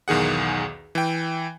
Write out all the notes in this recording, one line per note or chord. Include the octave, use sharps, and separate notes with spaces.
B1 E2 D#3 G#4 F#5
E3 G5